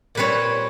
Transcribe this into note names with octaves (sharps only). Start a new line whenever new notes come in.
A#2 G3 C4 B4 C#5